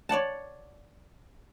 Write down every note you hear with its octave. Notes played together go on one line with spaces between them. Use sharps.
C#5 D5 F#5 A5